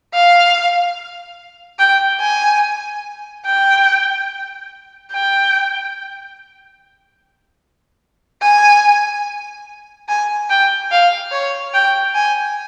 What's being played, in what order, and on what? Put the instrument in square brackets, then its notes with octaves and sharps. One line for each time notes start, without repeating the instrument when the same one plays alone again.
[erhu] F5
G5
G#5
G5
G5
G#5
G#5
G5
F5
C#5
G5
G#5